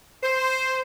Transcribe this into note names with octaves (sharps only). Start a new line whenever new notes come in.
C5